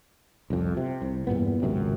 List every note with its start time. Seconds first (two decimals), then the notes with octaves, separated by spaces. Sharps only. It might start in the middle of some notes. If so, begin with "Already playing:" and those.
0.50 C2 F2
0.77 C3
1.02 C2
1.27 E2 G2 A#2 B3
1.62 G#1 C#2 F#2 C3